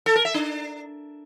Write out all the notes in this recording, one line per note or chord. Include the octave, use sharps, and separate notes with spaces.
A4
A#4
E5
D4